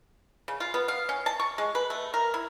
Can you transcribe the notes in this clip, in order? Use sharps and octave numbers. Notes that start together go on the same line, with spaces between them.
C#3
F4
B3
F5
C#4
A5
C#6
G#3
B4
A3
A#4
E4